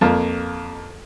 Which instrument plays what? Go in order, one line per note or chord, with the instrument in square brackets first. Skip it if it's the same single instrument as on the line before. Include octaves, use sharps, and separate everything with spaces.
[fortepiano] F2 A#3